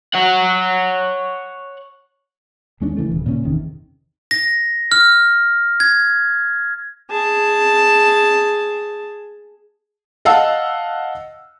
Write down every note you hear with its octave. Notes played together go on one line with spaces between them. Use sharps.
C#5 F#5
D#2 G#3 C#4 D4
C#3 E3 A3
D#1 C#3
A#2 C#3 B3 C#4
F#1 E2 C3 D#3
A#6
F6
G#6
G#4 A5
D#5 F5 F#5 A5 E6